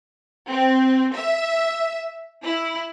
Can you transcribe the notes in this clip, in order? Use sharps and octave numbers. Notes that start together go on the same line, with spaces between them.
C4
E5
E4